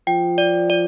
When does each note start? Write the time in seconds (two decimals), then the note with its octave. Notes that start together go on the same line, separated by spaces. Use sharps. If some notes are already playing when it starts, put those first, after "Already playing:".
0.07 F3 G5
0.38 D5
0.70 D5